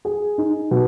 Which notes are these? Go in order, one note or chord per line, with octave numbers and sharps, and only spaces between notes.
G#4
D#4
B2